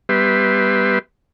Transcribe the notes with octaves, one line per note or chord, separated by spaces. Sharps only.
G3 B3 G4 B4 E5 C6